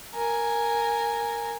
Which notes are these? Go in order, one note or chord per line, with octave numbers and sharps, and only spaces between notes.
A#4 G#5